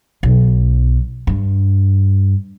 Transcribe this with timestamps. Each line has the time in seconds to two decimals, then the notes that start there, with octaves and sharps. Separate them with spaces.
0.23 B1
1.27 G2